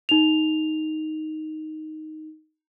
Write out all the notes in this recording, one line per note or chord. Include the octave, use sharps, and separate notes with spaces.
D#4 F7